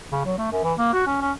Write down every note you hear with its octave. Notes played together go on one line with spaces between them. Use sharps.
C#3
F#3
A3
F#2
E3
A#3
F#4
C#4
C#4